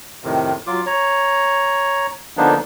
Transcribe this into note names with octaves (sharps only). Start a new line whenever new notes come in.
F2 A2 C3 D#3
F#3 F4 D6
C#5 A#5
D3 F3 A#3 B3 D4 D#4